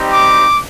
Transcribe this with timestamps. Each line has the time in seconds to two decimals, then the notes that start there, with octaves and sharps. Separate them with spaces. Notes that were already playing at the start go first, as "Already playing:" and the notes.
Already playing: G3 C4 D#4 G4
0.13 D6